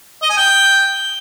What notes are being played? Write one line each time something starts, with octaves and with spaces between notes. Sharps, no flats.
D#5
G#5
G5